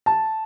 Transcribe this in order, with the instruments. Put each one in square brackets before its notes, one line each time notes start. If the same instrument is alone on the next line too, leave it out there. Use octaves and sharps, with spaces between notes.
[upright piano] A5